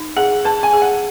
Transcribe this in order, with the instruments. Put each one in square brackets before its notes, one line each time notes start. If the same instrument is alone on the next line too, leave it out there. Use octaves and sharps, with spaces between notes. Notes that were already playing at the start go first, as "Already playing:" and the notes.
Already playing: [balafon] D#4
[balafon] G#4 [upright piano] F#5
[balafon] B4 [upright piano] A5
[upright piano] G#5
[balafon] G#4
[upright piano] F#5